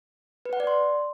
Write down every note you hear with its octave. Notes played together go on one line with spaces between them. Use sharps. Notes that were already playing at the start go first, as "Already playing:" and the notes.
B4
F#5
D5
C6